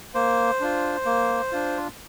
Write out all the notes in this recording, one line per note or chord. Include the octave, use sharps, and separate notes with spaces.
A#3 C5
D4 F4
A#3
D4 F4